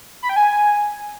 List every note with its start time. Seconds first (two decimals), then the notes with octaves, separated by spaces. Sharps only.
0.22 B5
0.29 G5
0.36 G#5